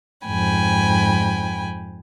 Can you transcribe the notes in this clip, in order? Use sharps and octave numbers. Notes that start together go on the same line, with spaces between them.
F2 G#2 G5 G#5 B5